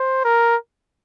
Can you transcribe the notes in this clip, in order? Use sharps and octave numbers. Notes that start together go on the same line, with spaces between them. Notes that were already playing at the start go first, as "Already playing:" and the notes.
Already playing: C5
A#4